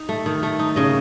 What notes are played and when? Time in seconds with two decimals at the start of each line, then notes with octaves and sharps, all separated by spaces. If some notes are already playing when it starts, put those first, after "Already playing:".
Already playing: D#4
0.09 A3
0.26 D#3
0.43 A3
0.59 D#4
0.76 C#3 D#5